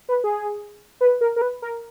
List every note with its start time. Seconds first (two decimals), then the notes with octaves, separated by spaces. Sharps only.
0.09 B4
0.24 G#4
1.01 B4
1.21 A#4
1.36 A#4
1.41 B4
1.62 A#4